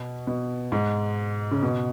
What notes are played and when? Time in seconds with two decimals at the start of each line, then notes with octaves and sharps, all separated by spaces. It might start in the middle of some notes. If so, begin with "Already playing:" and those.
Already playing: B2
0.27 B2
0.72 G#2
1.51 C#3
1.62 B2